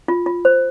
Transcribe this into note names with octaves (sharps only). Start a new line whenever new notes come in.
F4
F4
C5